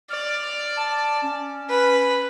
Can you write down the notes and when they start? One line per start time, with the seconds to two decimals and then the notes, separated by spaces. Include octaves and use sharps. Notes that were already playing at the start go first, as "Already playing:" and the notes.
0.11 D5 F6
0.77 A5
1.23 C#4
1.70 B4